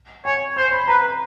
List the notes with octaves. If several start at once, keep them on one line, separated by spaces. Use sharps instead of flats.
C#5 G#5
C5 C6
B5
B4 A#5